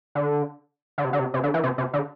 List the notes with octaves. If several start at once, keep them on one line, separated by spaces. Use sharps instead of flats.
D3
D3
C3
D3
C3
C3
D3
E3
C3
C3
D3